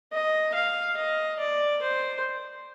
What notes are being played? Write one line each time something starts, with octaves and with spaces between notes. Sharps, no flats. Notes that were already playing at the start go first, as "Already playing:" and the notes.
D#5
F5
D#5
D5
C5